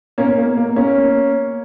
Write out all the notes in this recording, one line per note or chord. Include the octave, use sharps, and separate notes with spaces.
B2 A#3 C#4
A#3
A#3
A#3 C#4